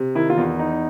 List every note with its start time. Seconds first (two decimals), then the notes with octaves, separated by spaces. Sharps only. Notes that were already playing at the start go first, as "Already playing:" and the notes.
Already playing: C3
0.15 D#3 E4
0.30 F4
0.37 E2
0.59 D#4